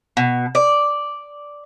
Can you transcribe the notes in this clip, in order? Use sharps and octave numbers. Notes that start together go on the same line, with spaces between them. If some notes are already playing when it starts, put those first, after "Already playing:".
B2
D5